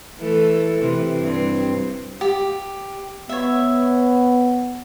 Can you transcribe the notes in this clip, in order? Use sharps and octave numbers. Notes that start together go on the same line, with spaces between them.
E3 A3 A4
C3 E3
G2 C4
G4
B3 C#5 E5